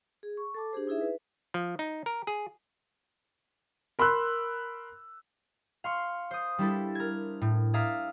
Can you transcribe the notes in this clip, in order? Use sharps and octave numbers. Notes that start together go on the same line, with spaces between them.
G#4
C#6
A4 A5 D6
D4 G4 G#4 C5
D#4 E4 G#4 E5
B4
F3
D#4
A#4
G#4
A#4 B5 C6 E6 F#6
F5 C6 C#6
C5 D#6
G3 D4 E4 A4
A#4 G#6
A2
G#4 D5 E5 F5 A#5